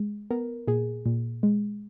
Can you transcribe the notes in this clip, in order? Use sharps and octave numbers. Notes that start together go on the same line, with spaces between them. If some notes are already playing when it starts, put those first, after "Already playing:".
Already playing: G#3
B3 A#4
A#2 G#4
A#2
G#3